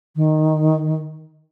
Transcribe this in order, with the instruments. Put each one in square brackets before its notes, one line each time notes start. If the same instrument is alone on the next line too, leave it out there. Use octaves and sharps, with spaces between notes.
[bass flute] D#3